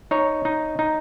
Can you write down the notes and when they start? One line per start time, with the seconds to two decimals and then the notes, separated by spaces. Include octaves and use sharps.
0.11 D#4 C#5
0.45 D#4
0.79 D#4